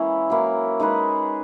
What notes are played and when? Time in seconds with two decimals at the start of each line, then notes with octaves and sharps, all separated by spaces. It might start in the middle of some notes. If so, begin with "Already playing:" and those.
Already playing: E3 G#3 A#3 C#4 E4
0.30 F#3 A#3 E4
0.80 G#3 D#4 G#4 B4